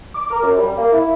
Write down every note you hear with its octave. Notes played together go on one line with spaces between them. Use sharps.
D6
A#4
F#2
G3
A#3
E4